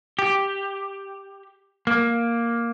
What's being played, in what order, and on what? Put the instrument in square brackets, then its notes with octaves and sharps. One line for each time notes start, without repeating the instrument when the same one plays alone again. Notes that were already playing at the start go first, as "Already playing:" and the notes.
[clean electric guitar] G4
A#3